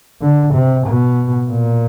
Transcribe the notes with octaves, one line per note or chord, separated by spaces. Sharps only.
D3
C3
B2
A#2